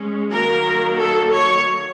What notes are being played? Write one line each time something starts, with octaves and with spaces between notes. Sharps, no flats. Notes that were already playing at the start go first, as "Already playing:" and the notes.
Already playing: G#3 C#4
D#3 F#3 A#3 A#4
A4
C#5